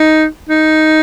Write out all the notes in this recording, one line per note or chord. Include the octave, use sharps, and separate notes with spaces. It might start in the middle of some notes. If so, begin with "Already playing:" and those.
Already playing: D#4
D#4